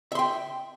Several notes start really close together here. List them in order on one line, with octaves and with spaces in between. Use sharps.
E5 C6 G5